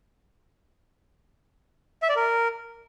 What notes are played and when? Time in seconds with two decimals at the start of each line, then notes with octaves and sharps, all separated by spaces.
2.02 E5
2.09 D5
2.16 A#4